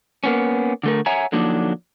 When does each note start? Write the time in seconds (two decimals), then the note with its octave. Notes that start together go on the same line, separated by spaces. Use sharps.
0.24 A#3 B3 C#4
0.83 D3 A3 A#4
1.06 C#5 E5 F#5 G#5 A#5
1.32 D3 F3 F#3 A#3 D4 D#4